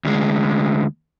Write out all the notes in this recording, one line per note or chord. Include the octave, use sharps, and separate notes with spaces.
D2 G#3